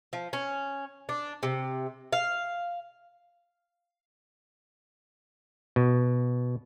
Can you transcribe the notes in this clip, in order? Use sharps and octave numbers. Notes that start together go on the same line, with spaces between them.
F3
C#4
D4
C3
F5
B2